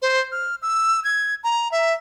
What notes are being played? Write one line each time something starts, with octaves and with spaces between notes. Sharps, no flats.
C5
F6
E6
G#6
A#5
E5